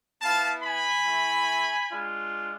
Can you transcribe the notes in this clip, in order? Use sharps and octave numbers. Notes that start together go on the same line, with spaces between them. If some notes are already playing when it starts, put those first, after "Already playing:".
B3 E4 F5 A5
G#5 B5
A3 E4
G#3 D4 F4